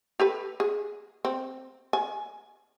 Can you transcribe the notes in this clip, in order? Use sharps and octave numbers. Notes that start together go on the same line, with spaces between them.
G4 A4 B4
G#4
C4
G#5